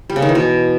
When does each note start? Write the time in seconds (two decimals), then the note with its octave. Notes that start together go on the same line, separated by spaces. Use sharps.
0.10 G3
0.16 C#3
0.22 D#3
0.29 E3
0.35 B2